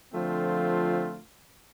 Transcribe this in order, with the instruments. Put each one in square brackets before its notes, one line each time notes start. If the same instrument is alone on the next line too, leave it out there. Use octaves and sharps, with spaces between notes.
[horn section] D3 F3 A3 C4 F4